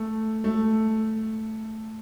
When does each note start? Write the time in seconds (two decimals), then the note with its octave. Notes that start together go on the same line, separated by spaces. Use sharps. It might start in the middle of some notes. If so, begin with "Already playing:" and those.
Already playing: A3
0.44 A3